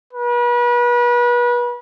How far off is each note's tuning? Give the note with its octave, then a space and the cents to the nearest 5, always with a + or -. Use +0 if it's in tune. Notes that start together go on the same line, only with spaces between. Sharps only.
B4 -35